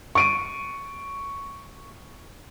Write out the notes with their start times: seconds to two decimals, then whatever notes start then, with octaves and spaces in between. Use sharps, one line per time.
0.15 C#6 D7 D#7